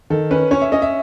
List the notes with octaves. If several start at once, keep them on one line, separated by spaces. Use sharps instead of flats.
D#3 A4
C#4 B4
C#4 C#5
E5
C#4 D#5
E5